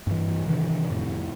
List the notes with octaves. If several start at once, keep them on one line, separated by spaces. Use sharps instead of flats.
G2 E3
C3 D#3 E3 D4
F2 A2